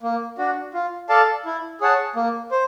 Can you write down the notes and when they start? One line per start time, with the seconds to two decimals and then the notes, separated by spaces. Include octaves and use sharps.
0.03 A#3
0.38 D4 F#4
0.74 F4
1.09 A4 D5 F5 A5
1.45 E4
1.81 G#4 C#5 F#5 A5
2.16 A#3
2.51 C5